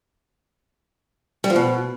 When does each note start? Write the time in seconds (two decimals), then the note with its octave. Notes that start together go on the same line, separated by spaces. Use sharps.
1.44 G3
1.50 F3
1.56 B2